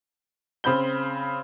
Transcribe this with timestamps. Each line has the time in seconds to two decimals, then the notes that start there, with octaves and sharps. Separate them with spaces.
0.64 C#3 C4 B5 G6 G7